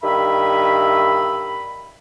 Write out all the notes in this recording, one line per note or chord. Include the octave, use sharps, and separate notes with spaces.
G2 D#3 E5 B5